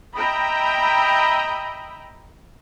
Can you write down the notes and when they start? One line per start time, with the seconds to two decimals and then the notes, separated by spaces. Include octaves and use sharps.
0.14 D#5 E5 G5 A#5 B5